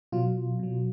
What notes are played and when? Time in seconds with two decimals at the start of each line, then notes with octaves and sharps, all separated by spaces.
0.12 B2 F#3 F4
0.59 B2 F#3